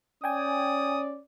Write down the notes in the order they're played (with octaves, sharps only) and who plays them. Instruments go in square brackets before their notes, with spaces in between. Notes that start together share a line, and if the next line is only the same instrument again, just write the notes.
[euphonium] C#4 [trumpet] D5 [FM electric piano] G5 G#5 [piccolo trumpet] D#6